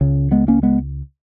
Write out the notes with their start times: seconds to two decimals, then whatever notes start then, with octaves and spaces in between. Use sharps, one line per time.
0.01 C#2 C#3
0.31 G#3 B3
0.48 A#3 C#4
0.63 G#3 B3